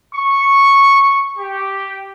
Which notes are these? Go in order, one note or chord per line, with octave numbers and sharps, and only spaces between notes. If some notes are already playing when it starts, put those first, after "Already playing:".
C#6
G4